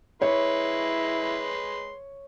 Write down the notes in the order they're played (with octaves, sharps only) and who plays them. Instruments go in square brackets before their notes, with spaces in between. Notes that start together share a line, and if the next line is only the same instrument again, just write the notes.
[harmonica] G#3 B4 C6 [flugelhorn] E4 [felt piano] C#5